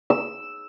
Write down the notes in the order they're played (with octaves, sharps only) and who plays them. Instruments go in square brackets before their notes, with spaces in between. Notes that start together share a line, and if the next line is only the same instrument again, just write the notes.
[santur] E6